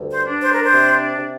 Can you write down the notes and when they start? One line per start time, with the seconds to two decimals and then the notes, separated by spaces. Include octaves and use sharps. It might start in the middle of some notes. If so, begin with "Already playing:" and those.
Already playing: D2 G2
0.11 C5
0.26 D4
0.42 C5
0.53 A#4
0.64 C5
0.72 C3
1.19 C3